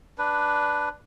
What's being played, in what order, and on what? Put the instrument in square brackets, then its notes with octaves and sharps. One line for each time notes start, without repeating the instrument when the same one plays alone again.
[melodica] D4 B4